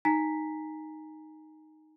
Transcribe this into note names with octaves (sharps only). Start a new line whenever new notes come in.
D#4 G#5 A#5 B6